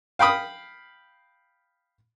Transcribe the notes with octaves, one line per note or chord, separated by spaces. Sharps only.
F5 G5 B5 D#6